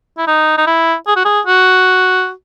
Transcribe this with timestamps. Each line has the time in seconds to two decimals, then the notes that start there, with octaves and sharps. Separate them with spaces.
0.18 E4
0.27 D#4
0.58 D#4
0.67 E4
1.07 G#4
1.16 F#4
1.25 G#4
1.47 F#4